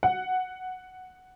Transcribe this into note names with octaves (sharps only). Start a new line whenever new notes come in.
F#5